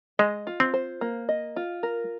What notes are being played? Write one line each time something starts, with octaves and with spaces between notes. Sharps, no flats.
G#3 D#5
F4
C4
C5
A#3
D#5
F4
A#4